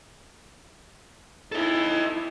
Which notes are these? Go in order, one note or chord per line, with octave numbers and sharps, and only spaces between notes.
D#4 E4 A4 D#5